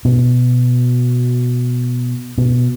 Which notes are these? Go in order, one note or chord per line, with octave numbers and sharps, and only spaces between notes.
B2
B2